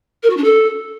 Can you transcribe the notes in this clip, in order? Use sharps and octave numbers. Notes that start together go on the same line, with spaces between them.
A#4
F#4
D4
A4